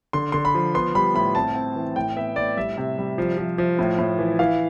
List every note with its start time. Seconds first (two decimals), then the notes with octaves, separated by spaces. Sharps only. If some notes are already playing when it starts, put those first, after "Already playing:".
0.13 D3 C6
0.32 D3 C6
0.45 B5
0.55 F3
0.74 B3 C6
0.95 G3 B5
1.15 A2 B5
1.35 C4 A5
1.55 C4
1.76 E3
1.96 A2 G5
2.17 B3 E5
2.36 A2 D5
2.57 G3 E5
2.77 C3
2.98 G3
3.18 F3
3.38 F3
3.58 F3
3.79 A2
3.99 A2
4.19 E3
4.39 E3 F5